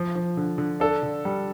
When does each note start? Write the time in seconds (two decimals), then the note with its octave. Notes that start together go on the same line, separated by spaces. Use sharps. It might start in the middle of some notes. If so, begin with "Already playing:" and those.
Already playing: F3
0.15 F3
0.37 D3
0.58 D3
0.80 D4 A4
1.03 D3
1.25 G3